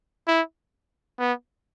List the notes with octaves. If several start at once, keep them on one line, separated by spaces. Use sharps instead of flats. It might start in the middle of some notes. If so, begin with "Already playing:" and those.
E4
B3